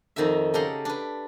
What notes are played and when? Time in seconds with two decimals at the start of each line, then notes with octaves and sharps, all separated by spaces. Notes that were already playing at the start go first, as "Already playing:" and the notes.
0.16 F2 D#3 D#4 F#4 E5
0.54 C#3 G4 A4 F#5 A#5 C6
0.85 D4 B4